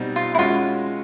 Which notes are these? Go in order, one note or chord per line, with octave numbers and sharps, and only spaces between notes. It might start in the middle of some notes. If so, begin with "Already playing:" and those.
Already playing: B2 G3 C4 D#4
F4
E4
G#3 C#4 F4 F#4